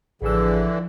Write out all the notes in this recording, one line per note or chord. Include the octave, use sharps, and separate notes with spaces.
A1 D3 E3 F3 G#4 E6